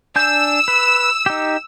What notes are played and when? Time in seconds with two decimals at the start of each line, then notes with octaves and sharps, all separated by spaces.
0.16 D4 G#5 E6 G6
0.68 B4
1.26 D#4 G4